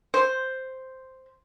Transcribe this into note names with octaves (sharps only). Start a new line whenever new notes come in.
C5